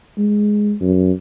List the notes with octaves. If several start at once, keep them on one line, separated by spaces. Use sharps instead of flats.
G#3
F#2